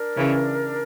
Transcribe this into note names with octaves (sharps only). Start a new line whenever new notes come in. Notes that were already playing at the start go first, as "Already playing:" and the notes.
Already playing: D4 A#4 D5
C#3 E3